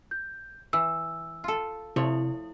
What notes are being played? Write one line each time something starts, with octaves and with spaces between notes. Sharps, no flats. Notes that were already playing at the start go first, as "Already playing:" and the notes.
G6
E3 E6
F4 A4
C3 F3 A3 E4 C#5